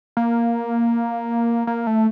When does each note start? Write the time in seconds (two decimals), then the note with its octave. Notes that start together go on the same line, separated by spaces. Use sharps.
0.17 A#3
1.67 A#3
1.87 A3